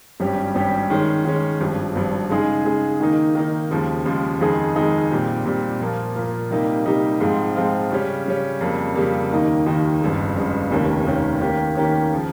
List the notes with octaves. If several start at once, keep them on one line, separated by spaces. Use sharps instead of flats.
G#1 G2 G3 C#4 G4
G#1 G2 G3 C#4 G4
D#3 G#3 C#4
D#3 G#3 C#4
G#1 G2 F3
G#1 G2 F3
C#3 G#3 D#4 G#4
C#3 G#3 D#4 G#4
D#3 A#3 D#4
D#3 A#3 D#4
D#2 C#3 F3 G#3
D#2 C#3 F3 G#3
F2 D#3 G#3 D#4 G#4
F2 D#3 G#3 D#4 G#4
A#2 G3 C4
A#2 G3 C4
A#2 F3 A#3 F4
A#2 F3 A#3 F4
C3 G3 A#3 D#4
C3 G3 A#3 D#4
G#2 F3 G#3 C4 F4
G#2 F3 G#3 C4 F4
C#3 G3 C#4
C#3 G3 C#4
F2 C#3 G3 A#3
F2 C#3 G3 A#3
D#2 D#3 A#3 D#4
D#2 D#3 A#3 D#4
G1 F2 C#3 G#3
G1 F2 C#3 G#3
F1 D#2 D#3 A#3 C#4
F1 D#2 D#3 A#3 C#4
D#3 A#3 C#4 G4
D#3 A#3 C#4 G4
C#3 F3